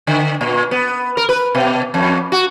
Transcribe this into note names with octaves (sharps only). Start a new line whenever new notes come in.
D3
A#2
B3
A#4
B4
B2
F2
F#4